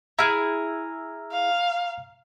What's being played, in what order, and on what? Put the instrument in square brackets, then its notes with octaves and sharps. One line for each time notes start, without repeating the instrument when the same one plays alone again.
[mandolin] E4 G#4 [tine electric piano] A#5 F6
[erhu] F5